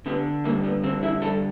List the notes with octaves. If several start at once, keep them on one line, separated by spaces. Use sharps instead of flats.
D3 B3
G2 A#3
B3
D3 C4
E4
G2 A4